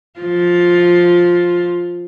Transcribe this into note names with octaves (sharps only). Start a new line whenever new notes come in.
F3 F4